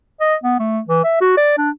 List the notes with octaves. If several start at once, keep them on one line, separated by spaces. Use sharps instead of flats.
D#5
B3
A3
E3
E5
F#4
D5
D4